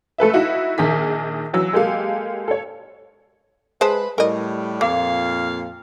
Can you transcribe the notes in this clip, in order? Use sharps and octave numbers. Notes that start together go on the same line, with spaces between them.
A3 A4 B4 E5
D#4 E4 F#4 E5
A#1 D#3 G#4 B6
E3 F#3 E6
G#3 A#3 G4 A4 F5
A4 C#5
G#3 B4 C5 A5
A2 G3 A#4 D#5
F2 A#2 A#3 F5